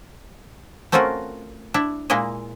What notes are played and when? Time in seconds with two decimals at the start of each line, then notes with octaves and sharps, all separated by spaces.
0.92 A3 C4 C#4 F4 F#4 A#4
1.74 D4 E4
2.10 A#2 G#3 A#3 E4 D#5